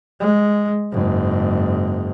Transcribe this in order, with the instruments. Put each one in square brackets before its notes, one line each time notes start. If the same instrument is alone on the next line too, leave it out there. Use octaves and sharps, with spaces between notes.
[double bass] G#3
F#1 G#2